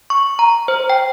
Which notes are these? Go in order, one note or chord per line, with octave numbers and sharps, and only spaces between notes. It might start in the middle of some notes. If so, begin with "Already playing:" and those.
C#6
A#5
C5
G5